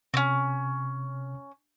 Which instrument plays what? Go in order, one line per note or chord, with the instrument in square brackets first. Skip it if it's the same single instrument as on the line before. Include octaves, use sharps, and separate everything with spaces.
[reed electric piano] C3 [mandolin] C4 C#4